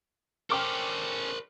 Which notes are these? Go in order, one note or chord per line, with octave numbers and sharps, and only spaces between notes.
C#4 A4 A#4 C5 G5 D6 F6